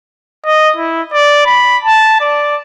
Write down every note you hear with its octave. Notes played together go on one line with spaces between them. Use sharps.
D#5
E4
D5
B5
A5
D5